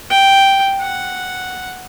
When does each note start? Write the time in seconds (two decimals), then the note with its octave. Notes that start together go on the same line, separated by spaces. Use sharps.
0.10 G5
0.81 F#5